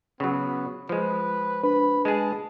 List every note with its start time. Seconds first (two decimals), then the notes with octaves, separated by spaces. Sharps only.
0.20 C#3 F#3 B3
0.89 F3 G#3 B4
1.63 D4 B4 B5
2.05 G#3 G#4 A5